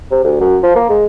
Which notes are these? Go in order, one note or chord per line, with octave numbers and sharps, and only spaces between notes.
C3
D2
F#2
F3
A#3
G#3